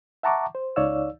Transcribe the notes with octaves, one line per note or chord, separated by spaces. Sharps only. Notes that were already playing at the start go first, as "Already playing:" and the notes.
E5 F#5 A5 A#5 C#6 D6
C5
C#2 D#4 C#5 D5 F5 E6